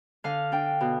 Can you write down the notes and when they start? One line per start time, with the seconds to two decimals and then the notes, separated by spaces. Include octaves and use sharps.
0.24 D3 F5
0.52 D4 G5
0.81 B2